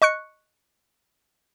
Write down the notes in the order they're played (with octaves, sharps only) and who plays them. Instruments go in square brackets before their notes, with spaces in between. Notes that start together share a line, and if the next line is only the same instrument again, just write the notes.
[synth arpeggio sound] D#5 C#6 F#6 C#7